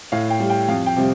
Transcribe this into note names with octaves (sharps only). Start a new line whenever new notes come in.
A2 F5
G5
G3
G5
F2 F5
G5
C3 G3